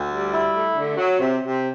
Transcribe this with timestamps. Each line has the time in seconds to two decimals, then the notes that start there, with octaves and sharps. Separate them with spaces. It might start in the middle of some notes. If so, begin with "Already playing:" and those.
Already playing: D2
0.13 G3
0.33 E4
0.55 A3
0.76 D3
0.97 F#3
1.19 C3
1.41 C3